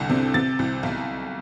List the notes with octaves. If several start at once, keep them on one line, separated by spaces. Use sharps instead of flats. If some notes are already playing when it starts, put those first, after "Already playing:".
Already playing: C2 D3
C3
C3 A6
C2
B1